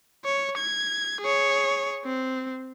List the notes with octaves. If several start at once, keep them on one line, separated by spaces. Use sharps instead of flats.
C#5
G#6
G#4 C#5
C4